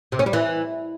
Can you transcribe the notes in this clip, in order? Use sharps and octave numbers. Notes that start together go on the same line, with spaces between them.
C3
C#4
G3
E3